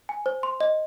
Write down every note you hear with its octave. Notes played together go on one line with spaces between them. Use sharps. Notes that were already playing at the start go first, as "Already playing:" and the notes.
G#5
C5
C6
D#5